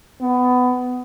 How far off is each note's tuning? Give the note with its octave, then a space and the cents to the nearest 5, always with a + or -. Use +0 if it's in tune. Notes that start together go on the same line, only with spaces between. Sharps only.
B3 +20